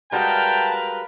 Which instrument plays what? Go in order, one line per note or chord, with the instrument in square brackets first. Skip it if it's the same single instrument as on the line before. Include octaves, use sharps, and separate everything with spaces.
[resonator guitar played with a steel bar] G3 G#3 F#4 [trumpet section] A#4 B4 F5 [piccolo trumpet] G5 [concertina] A5